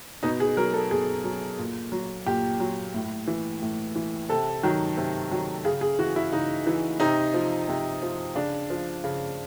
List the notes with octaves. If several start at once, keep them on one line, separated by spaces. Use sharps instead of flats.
B2 D#4
G#4
F#3 A#4
A4
B2 G#4
F#3
A#2
F#3
A#2 G4
F#3
A2
E3
A2
E3
C3 A4
D#3 F#3
C3
D#3 F#3
C#3 G#4
G#4
E3 F#4
E4
C#3 D#4
E3
C3 D#4
F3
C3
F3
C#3 D4
F3
C#3